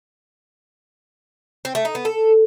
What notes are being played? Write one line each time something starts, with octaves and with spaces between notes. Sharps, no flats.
C4
A3
D#4
B3
A4